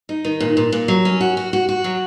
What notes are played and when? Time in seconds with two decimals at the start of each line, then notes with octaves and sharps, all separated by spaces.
0.09 D#4
0.25 D#3
0.40 A#2
0.57 A#2
0.72 A#2
0.88 F#3
1.05 C#4
1.21 F#4
1.37 F#4
1.53 F#4
1.69 F#4
1.84 F#3